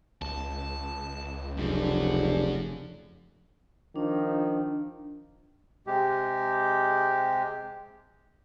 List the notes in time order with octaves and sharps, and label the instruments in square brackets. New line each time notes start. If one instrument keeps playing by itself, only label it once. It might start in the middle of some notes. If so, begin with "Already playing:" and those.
[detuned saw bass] C#2 [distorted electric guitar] A5
[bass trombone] F1 [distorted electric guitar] F#2 [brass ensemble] C#3 D4
[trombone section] D#3 F3 [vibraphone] D4
[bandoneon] C3 G#3 G4